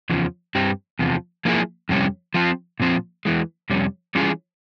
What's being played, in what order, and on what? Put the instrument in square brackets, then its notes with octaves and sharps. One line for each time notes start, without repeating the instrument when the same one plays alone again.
[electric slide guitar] E2 C#3 F3
G2 G3 C4 G4
E2 C3 F3
F3 A#3 E4 G#4
F2 C3 G3 C#4
F3 C4 F4
A#2 F3 C4
E2 E3 G#3
F2 C3 G3 C#4
E3 G3 C#4 F4 G#4